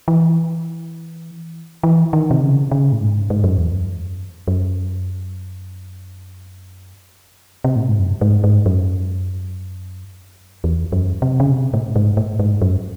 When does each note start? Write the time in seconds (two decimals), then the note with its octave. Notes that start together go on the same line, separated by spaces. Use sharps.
0.08 E3
1.83 E3
2.13 D#3
2.31 C3
2.42 C#3
2.71 C#3
2.92 A2
3.01 G#2
3.30 G#2
3.44 F#2
3.58 E2
3.71 F#2
4.48 F#2
7.64 C3
7.76 A2
7.88 G#2
7.99 F#2
8.21 G#2
8.44 G#2
8.66 F#2
10.64 E2
10.92 F#2
11.22 C3
11.40 C#3
11.51 C3
11.74 A2
11.96 G#2
12.17 A2
12.39 G#2
12.62 F#2